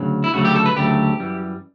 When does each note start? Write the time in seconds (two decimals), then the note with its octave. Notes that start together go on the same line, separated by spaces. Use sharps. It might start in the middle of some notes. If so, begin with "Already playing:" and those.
Already playing: D2 C#3 F#3
0.24 E4
0.33 D2 C#3 F#3 A3 F#4
0.45 G4
0.55 A4
0.66 B4
0.76 D2 C#3 F#3 A3 G4
1.19 F#2 E3 G3